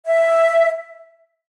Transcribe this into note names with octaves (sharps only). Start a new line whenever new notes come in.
E5